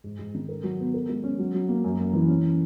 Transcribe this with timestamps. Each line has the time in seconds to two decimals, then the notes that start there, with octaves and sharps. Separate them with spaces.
0.04 G#2
0.19 G#2
0.34 D#3
0.49 A#4
0.63 F#3
0.80 B3
0.94 A#4
1.09 G#3
1.24 C#4
1.38 F#3
1.54 F#3
1.68 A#3
1.84 F#2
1.98 F#2
2.13 E3
2.28 C#4